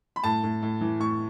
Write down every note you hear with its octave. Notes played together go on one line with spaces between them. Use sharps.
B5
A2 A5
A2
A2
E3
A2 C#6